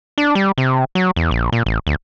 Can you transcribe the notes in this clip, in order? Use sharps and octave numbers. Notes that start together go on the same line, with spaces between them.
D4
G3
C3
F#3
E2
A#1
A#2
A1
D2